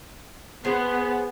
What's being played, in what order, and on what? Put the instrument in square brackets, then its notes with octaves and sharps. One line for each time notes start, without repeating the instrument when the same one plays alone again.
[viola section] B3 [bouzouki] G#4 C5